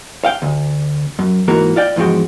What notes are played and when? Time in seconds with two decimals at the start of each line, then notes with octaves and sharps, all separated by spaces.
0.25 F5 G5
0.42 D2
1.19 F#2
1.48 G#2 E3 A#3 F#4 A#4
1.76 F4 D5 G5
1.96 E2 G#2 F3 G#3 F#4 G5